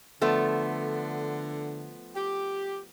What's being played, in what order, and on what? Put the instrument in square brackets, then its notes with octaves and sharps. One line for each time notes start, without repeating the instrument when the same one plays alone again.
[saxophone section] D3 [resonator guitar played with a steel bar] F3 A3 B3
[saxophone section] G4